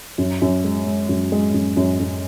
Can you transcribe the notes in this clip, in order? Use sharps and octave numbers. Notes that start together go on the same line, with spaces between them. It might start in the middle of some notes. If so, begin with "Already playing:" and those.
F#2
F#2
G#3
G#3
F#2
G#3
F#2
F#2
F#2